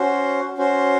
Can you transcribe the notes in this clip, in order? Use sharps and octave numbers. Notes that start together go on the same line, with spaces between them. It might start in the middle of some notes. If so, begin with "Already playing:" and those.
Already playing: C#4 F#4 C5
C#4 F#4 C5